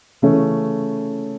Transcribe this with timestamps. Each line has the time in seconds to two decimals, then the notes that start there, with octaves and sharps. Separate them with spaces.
0.22 C#3 E3 A3 C#4